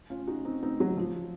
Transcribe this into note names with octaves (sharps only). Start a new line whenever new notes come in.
C#4 F4
D#4 F#4
C4 D#4
C4 D#4
F#3
F3